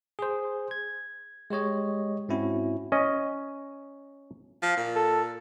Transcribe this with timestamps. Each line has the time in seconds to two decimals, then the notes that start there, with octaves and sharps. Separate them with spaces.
0.19 G#4 C5
0.71 G#6
1.50 G#3 G4 C#5 D#5
2.29 G#2 C4 C#4 E4 F#4
2.92 C#4 D#5
4.62 F3
4.77 A#2
4.96 A4